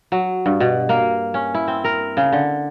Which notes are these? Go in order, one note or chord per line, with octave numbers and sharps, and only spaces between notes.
F#3
G2
B2
A#3
C#4
E4
C4
A#4
C#3
D3